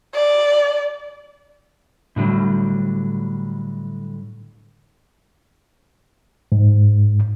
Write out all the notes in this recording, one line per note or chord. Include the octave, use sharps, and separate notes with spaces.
D5
A2 D3 F#3 G3
G#2